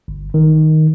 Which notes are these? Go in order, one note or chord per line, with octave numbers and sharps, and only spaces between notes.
G1
D#3